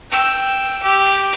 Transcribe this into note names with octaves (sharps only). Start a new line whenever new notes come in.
G5 E6
G4